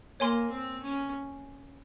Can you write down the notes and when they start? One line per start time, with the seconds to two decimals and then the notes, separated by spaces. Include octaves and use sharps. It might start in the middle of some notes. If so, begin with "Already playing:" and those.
0.20 A#3 C#5 G#5 C6
0.50 C4
0.82 C#4